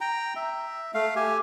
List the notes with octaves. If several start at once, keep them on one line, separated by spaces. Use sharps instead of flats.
G5 A#5
E5
A3 F5
G4 G#5